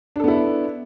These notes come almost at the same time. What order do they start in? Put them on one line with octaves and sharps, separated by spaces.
D4 A4 B3 E4